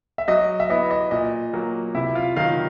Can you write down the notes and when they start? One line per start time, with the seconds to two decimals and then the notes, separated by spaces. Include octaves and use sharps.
0.18 E5
0.28 F#3 D#5
0.60 E5
0.70 B3 E4 D#5
0.91 D#5
1.11 A#2 D#5
1.53 F#3 A#3
1.95 C3 E4 E5
2.15 F4 F5
2.36 D#3 F#3 F4 F5